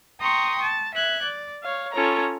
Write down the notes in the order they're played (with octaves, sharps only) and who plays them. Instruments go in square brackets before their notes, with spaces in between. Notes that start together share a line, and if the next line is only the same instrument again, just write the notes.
[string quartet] G5 A#5 C6 C#6 D#6
A5
E5 F#6 G#6
D5
C#5 F5
C#4 F4 A4 C#5 A#5